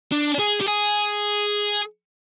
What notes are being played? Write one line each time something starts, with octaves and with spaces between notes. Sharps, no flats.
D4
G#4
G4
G#4